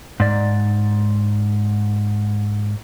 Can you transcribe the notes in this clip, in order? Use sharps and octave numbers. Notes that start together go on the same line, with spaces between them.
G#2 D5